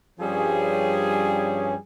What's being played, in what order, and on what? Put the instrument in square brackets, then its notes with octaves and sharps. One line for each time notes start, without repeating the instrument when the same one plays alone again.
[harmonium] G2 C#4 [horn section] F3 G3 G#4